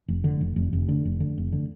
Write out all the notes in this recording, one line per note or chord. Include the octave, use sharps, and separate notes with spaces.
F1
D3
F1
F1
F1
D3
F1
D3
F1
D3